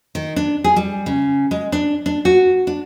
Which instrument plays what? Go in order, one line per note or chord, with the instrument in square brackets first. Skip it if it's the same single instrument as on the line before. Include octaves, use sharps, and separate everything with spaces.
[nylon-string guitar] D#3
D4
G#4
G3
C#3
G#3
D4
D4
F#4
D4